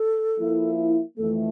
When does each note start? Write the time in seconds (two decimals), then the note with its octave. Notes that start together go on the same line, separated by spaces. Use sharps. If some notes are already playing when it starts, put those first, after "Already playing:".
Already playing: A4
0.38 F3 A#3 E4
1.17 F2 E3 A3 A4